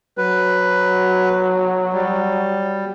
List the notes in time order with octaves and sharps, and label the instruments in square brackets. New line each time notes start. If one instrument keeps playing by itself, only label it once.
[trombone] F#3 [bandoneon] B4
[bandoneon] G3